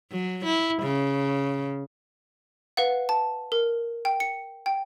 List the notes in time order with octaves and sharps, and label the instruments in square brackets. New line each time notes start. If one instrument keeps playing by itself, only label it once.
[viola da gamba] F#3
E4
C#3
[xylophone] B4 F5 F#5
A5
A#4
G5
C#7
G5